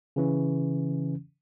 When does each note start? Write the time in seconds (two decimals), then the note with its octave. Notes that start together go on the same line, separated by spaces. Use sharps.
0.16 C#3 E3 C#4